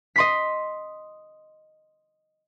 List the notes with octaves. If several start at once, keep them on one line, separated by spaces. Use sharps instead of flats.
D#5 C6 B6